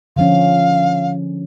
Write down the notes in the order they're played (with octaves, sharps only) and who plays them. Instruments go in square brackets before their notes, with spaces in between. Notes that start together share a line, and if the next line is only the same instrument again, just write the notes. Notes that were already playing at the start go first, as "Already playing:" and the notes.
[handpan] D3 F3 C#4 [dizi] F5